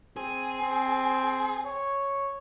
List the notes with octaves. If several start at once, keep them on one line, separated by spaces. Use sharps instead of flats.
C4 G#4
C4
C#5